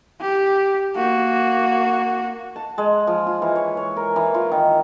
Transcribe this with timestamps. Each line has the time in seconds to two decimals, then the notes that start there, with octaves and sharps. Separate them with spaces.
0.21 G4
0.96 A#3 F#4
2.56 A5
2.78 G#3
3.07 F3
3.27 F4
3.42 E3
3.56 C#5
3.77 C#5
3.97 A#4
4.16 E3
4.34 F4
4.51 D#3